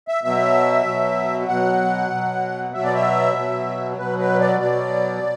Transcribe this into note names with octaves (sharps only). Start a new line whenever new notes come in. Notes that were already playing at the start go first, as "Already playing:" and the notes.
E5
B2 F#3 E5
B2 F#3
B2 F#3 F#5
B2 F#3
B2 F#3 E5
D5
E5
B2 F#3
B2 F#3 B4
B4
D5
B2 F#3 D5